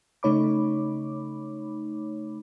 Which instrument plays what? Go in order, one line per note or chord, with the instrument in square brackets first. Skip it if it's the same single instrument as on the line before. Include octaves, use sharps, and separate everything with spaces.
[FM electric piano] C#3 A3 D#4 C#5 B5 D6